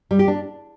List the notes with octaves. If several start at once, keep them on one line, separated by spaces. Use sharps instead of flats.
G3
G4
D4